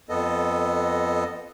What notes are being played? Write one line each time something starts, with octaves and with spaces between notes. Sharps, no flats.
F2 B3 A4 D#5